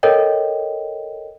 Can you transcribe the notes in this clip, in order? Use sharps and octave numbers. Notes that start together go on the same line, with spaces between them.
A4 A#4 C#5 D#5 G5